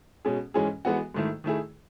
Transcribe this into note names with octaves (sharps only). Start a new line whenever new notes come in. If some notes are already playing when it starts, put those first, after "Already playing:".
B2 G#3 C#4 G#4
G#2 E3 G#3 C#4 G#4
E3 G#3 B3 F#4
G#2 D#3 A3 E4
D#3 A3 E4 G#4